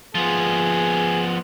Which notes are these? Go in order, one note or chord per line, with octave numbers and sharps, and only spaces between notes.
F3 B3 G#4